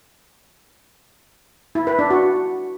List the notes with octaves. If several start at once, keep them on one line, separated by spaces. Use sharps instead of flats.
E4
B4
D4
F#4